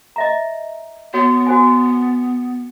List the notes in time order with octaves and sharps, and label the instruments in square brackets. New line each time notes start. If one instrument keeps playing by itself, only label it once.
[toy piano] D#5 E5 A#5
[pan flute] B3 [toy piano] F#4 C#5
[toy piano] F#4 C5 G#5